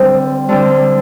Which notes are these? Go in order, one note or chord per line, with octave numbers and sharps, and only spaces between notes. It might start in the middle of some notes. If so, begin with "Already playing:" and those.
Already playing: D3 G3 C4
D3 G3 C4